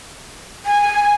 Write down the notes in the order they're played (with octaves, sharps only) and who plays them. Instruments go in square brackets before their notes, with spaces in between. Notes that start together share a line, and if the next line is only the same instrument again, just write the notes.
[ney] G#5